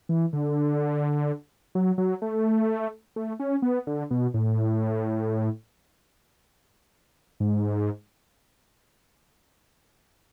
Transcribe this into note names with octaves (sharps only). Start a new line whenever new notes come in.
E3
D3
F#3
F#3
A3
A3
C#4
B3
D3
B2
A2
G#2